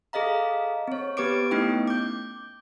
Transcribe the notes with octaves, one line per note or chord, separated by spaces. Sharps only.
G#4 A4 D#5 F5 A#5
C4 C#5
B3 G4 B4 D6 D7
A3 B3 C#4 D#4 E4 G5
D6 G6